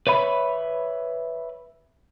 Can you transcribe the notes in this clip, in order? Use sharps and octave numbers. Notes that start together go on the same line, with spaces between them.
B4 C#5 E5 B5